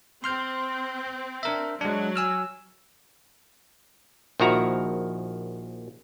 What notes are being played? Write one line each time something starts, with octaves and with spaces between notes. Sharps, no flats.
C4 C6 F6 G6
D4 A#4 E5
F#3 G#3 D4
G#5 E6 F6
A#1 D#3 F3 E4 F#4 A#5